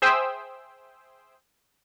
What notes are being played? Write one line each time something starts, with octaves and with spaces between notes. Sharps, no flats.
G#4 C5 E5 G5 D#6 E6